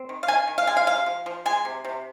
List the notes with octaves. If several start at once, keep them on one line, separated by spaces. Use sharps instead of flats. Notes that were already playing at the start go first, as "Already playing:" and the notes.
Already playing: C4
D#3
F5
D#3 G#5
D#3
F5
G#3 G#5
F5
C3 F5
F3
F3
G#3 G#5
C3
C3